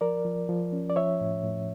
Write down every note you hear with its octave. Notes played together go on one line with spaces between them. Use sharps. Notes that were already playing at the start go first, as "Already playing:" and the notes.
F3 A#4 D5
F3
F3
C#4
D5
F3 C#5 E5
A2
A2